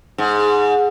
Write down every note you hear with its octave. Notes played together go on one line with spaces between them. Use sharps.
G#2